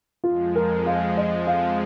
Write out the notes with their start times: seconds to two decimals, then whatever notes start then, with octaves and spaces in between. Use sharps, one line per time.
0.24 F2 F3 G#3 F4
0.56 A#4
0.86 F5
1.17 D#5
1.47 F5